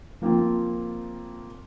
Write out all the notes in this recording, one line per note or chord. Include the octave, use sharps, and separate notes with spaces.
F3 A#3 C4 F4